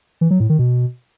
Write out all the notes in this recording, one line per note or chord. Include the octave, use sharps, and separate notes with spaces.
E3
F#3
A2
D#3
B2